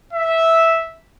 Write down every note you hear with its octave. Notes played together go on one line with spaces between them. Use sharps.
E5